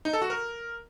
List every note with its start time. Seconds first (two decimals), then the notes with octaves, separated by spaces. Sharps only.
0.05 D#4
0.13 A4
0.22 F#4
0.30 A#4